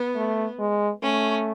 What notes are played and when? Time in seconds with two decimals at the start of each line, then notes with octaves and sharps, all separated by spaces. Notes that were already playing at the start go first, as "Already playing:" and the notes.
Already playing: B3
0.15 A3
0.59 G#3
1.03 A3 C#4